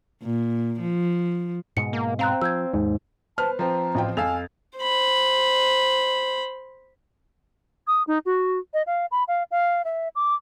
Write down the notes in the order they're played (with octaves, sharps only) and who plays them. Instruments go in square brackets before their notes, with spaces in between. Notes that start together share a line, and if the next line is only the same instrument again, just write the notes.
[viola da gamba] A#2
F3
[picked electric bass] G#2 B2 G#3 [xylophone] C#7
[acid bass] A#3
[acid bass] C4 [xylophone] F5 A#5 F#6
[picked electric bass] F3 [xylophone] E6 G6 G#6
[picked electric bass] D#2 [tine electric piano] G#2
[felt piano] B4 C5 F6 [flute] A5
[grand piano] F3 C4 [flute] A#5
[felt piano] A1 F4 G5
[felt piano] F2 [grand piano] F5 E6 F7 [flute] G#5
[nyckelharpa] C5 B5
[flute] D#6
D#4
F#4
D#5
F5
B5
F5
F5
E5
D6